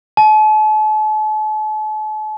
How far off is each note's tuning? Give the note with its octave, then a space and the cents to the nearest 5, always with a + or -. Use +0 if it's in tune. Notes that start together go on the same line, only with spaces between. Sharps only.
A5 -40